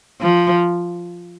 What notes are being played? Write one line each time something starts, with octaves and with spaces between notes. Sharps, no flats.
F3